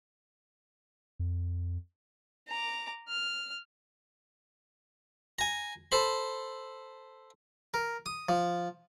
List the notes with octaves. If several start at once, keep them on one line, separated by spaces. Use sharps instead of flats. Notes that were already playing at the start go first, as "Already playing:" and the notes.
F2
A#5 D6
F6
G#5 A#5
A4 C5 B5
A#4
D#6
F3